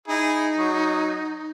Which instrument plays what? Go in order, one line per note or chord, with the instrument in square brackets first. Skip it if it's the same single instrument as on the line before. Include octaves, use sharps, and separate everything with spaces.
[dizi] D#4 [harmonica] E4 G#4
[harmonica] F#3